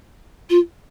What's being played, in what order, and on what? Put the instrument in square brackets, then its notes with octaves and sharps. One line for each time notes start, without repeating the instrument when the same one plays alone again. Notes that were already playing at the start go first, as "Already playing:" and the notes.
[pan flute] F4